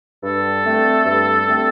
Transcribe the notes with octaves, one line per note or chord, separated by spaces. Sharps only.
G2 A4
D3 A3 C4
G2
D3 A3 C4